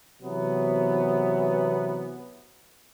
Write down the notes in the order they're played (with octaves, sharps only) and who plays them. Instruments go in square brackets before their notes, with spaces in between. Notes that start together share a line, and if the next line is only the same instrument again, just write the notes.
[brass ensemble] C3 E3 F#3 B3